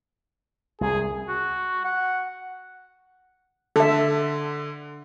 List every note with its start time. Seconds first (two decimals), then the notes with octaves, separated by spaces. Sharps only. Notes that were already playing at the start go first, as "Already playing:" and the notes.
0.81 C2 G#4
1.28 F#4
1.85 F#5
3.76 D3 A4 E5